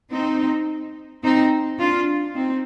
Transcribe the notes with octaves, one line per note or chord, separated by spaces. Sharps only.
C4 D#4
C4 D#4
D4 F4
C4 D#4